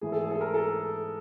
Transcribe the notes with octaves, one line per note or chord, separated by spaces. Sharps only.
G#2 E3 A3 G#4
A4
G#4
A4
A#4
A4